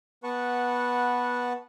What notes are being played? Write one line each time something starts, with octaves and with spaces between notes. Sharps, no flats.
B3 B4 F#5 A5 C#6